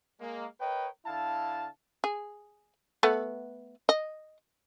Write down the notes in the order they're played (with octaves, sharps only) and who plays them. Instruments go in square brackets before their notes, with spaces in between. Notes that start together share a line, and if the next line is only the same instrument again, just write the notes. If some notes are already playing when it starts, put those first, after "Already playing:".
[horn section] G#3 A#3
A#4 B4 C#5 D#5 G5
D3 E4 F5 A5
[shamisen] G#4
A3 B3 F#5
D#5